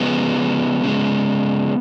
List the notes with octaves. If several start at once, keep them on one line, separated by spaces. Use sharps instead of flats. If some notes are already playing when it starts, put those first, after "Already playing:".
Already playing: C#3 F3 G#3 B3
C#3 F3 G#3